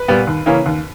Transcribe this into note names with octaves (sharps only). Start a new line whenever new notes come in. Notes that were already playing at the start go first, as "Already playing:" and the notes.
Already playing: B4
A#2 G3 B3
D#2
C#3 E3 A#3 C#4
D#2